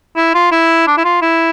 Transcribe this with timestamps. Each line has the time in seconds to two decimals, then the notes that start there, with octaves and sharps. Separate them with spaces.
0.16 E4
0.34 F4
0.52 E4
0.87 D4
0.97 E4
1.04 F4
1.22 E4